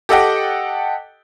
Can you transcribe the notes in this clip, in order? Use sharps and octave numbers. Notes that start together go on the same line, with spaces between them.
G4 A4 D#5 F#5 G5